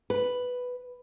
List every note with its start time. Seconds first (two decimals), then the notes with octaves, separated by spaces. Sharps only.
0.10 B4